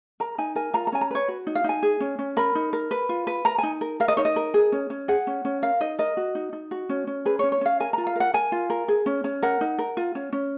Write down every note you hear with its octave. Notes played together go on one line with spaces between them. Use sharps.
A#4 A#5
D#4 G#5
A#4 G#5
F4 A#5
A#5
C#4 G#5
A#5
B4 C#5
F#4
D#4
F5
D#4 G#5
G#4
C#4
C#4
A#4 B5
D#4
A#4
B4
F4
B4
A#4 A#5
D#4 G#5
A#4
A#4 F5
D#5
D#4 C#5
D#5
A#4
G#4
C#4
C#4
G#4 F#5
C#4
C#4
A#4 F5
D#4 D#5
A#4 D#5
F#4
D#4
D#4
F#4
C#4
C#4
G#4 B4
C#5
C#4
C#5
C#4 F5
A#4 G#5
F4 A#5
F5
A#4 F#5
A#4 G#5
F4
A#4
G#4
C#4
C#4
A#4 F#5
D#4
A#4
F4
C#4
C#4